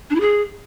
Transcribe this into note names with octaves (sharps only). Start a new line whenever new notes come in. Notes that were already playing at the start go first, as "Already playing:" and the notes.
D4
E4
G#4